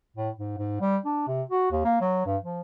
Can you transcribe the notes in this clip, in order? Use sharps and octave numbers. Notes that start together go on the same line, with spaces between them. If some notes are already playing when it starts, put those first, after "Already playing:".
A2
G#2
G#2
G3
D4
C3
F#4
D#2
A#3
F#3
G2
F3